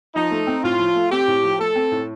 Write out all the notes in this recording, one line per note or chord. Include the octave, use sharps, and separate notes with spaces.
F3 D#4
A3
C4
A2 F4
F3
A3
C4 G4
A2
F3
A3 A4
C4
A2